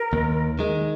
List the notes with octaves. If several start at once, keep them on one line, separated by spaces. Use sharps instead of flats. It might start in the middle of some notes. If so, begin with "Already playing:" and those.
Already playing: A#4
D#2
D#3 G#3